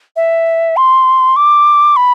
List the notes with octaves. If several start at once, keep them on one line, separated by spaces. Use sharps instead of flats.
E5
C6
D6
B5